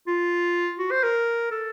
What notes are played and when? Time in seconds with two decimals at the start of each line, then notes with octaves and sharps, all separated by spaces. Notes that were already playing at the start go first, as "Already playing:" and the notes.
0.07 F4
0.79 F#4
0.91 C5
1.04 A#4
1.51 A4